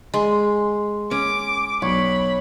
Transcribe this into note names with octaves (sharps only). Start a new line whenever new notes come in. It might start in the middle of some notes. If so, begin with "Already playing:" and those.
G#3 C6
C#4 D6
B1 C#5 B5